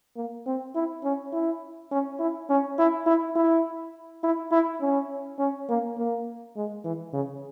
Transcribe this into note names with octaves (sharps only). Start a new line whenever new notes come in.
A#3
C4
E4
C#4
E4
C#4
E4
C#4
E4
E4
E4
E4
E4
C#4
C#4
A#3
A#3
G#3
E3
C#3